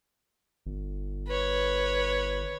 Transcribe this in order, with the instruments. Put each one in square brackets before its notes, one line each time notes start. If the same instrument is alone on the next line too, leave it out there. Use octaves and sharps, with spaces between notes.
[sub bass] G1
[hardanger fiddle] B4 C#5